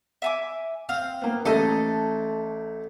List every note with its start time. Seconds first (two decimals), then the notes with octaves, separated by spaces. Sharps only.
0.22 E5 G#5 D6
0.89 C4 F5
1.22 A#3 B3
1.45 A1 A3 A4 D#5 A#5